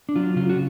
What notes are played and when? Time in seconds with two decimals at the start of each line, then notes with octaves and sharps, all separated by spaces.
0.09 D4
0.16 F#3 F4
0.36 C#3 F4
0.49 F#4